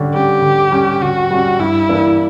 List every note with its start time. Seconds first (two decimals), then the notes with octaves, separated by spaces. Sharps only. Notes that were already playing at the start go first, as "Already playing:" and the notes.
Already playing: D3 G3 C#4
0.13 G3 C#4 G4
0.42 D3
0.72 G3 C#4
1.01 D3 F#4
1.30 G3 C#4
1.59 G2 E4
1.89 E3 A#3 D4